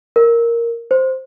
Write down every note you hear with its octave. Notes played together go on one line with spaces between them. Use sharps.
A#4
C5